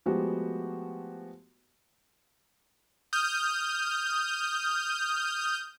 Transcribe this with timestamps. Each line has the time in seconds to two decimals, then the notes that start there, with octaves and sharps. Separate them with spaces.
0.06 F3 G#3 A3 B3 F#4 G4
3.13 D#6 F6 G6